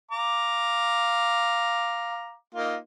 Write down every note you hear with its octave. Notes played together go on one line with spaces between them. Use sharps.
F5 A#5 D6
A#3 D#4 F4